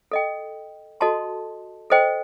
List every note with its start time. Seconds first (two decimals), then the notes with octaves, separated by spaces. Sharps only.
0.11 A4 D#5 G5
1.01 F#4 A4 D#5 A5 C6
1.90 A4 C5 D#5 G5